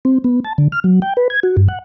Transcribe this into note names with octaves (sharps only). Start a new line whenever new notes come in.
C4
B3
A5
D3
F6
F#3
G5
B4
G#6
F#4
G2
F#5